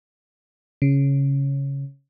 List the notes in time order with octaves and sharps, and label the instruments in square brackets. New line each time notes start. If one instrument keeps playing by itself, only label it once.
[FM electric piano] C#3